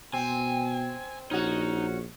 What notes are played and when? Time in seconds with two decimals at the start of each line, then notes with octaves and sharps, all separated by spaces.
0.13 B2 C4 G#5
1.31 A#1 C#4 D#4 F#4